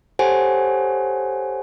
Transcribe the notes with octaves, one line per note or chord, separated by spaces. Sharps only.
G4 A4 C5 C#5 F#5 G#5